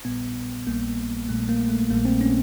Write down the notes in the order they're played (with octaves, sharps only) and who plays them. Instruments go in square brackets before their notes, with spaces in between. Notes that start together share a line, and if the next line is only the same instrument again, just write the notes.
[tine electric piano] A#1 A#2 G3 B3
A#1 A#2 G3 A#3
A#1 A#2 G3 A3
A#3
A3
A#1 A#2 G3 A#3
C4
C#4